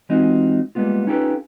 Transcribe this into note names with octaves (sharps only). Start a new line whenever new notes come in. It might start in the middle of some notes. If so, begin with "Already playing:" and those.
E3 G#3 C4 D#4 F4 F#4
G3 G#3 A#3 B3 F4
C#4 D#4 F4 G4 A4 B4